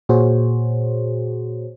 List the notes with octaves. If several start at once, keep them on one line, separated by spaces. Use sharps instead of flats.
A#2 F#4 G#4 C5 C#5